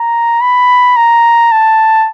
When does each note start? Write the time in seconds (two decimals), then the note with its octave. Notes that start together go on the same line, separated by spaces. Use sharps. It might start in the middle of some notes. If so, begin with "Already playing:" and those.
Already playing: A#5
0.41 B5
0.96 A#5
1.52 A5